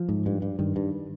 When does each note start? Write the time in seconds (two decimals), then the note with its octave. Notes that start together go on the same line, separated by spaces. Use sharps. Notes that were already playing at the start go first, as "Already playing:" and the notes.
Already playing: F3
0.09 G#2
0.26 G2
0.42 G2
0.59 G2 D#3
0.76 G2